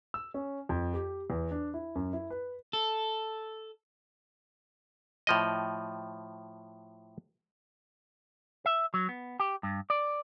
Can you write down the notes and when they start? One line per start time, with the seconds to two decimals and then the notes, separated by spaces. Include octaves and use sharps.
0.14 E6
0.34 C#4
0.69 F2
0.94 G4
1.30 E2
1.51 D4
1.74 E4
1.95 F#2
2.13 E4
2.30 B4
2.73 A4
5.27 A2 F3 D#5
8.66 E5
8.94 F#3
9.09 B3
9.40 G4
9.63 G2
9.90 D5